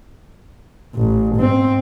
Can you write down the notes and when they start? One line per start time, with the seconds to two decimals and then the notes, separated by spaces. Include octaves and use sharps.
0.95 A1
1.35 G#2 C4